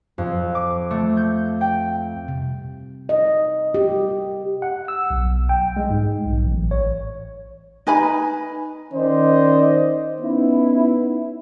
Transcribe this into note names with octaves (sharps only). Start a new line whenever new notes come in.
F2
D6
A3
G6
G5
C3
D#5
G4
F#5
E6
B1
G5
G#3
G#2
B1
A1
C#5
D#4 B4 G#5 B5
D#3 C#4 D#4 C5 D5 D#5
B3 C#4 D#4 E4